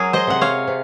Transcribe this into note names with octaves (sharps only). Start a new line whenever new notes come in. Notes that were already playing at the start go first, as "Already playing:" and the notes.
Already playing: F#3 G#4 A#4
C5 D#5
C3 F#5
C#5 F5
C3